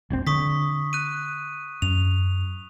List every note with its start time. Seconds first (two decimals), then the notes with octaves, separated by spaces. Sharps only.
0.10 E1 A#1 C4
0.27 D3 C#6 D#6 B6
0.93 F#6 D#7
1.82 F#2 F7